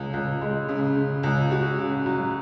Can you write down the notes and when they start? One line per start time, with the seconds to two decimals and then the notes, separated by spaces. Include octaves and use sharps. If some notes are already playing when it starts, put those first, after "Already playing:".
Already playing: C#2
0.13 C#2
0.41 G#3
0.69 C#3
0.96 C#3
1.23 C#2
1.51 F#4
1.78 C#3
2.06 F#3